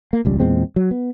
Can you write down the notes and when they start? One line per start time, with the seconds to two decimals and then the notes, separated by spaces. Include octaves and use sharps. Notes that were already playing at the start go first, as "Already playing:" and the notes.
0.13 A#3
0.25 E1 C#2 G3
0.40 E2 A#2 G#3 C4
0.76 F#3
0.91 B3